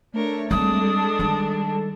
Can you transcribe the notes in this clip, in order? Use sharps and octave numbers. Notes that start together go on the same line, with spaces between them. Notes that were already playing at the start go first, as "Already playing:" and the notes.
A3 D4 A#4 C#5
G3 G#3 C4 D4 D#6
A4 A5
D#3 G3